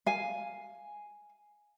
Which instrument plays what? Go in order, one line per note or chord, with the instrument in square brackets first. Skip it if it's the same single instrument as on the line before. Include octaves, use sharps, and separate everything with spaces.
[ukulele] F5 G#5